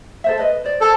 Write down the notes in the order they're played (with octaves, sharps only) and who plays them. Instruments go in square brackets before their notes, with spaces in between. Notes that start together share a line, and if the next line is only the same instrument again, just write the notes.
[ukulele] A4 C5 E5
B4 D#5
C5 D5
[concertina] A4 [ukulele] C5 C#5